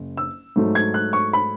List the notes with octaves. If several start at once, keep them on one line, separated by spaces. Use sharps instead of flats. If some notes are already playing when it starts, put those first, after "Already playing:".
Already playing: F#1
E6
G#2 F#3 A3
G#6
F#6
C#6
B5